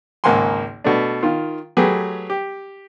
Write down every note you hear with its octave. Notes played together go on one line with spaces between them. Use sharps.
G#1 C#2 A#3 F#5 G#5 C6
B2 A3 D4
D#3 F4
F#3 A3 G4 G#4 B4
G4